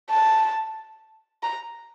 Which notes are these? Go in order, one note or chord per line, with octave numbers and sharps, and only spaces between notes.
A5
A#5